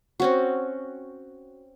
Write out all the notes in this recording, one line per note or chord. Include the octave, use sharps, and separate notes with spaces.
C4 C#4 F#4